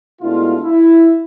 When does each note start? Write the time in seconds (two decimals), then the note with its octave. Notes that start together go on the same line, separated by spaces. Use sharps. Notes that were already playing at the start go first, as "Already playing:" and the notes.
0.22 B2 G#3 A3 D4 E4 F4
0.63 E4